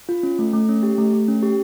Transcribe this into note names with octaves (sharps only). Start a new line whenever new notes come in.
F4
C#4
A3
A3
C#4
G4
A3
A3
C#4
G4